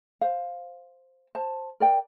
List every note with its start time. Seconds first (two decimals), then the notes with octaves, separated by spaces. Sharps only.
0.21 C5 F5
1.35 C5 A5
1.80 A#4 D5 G5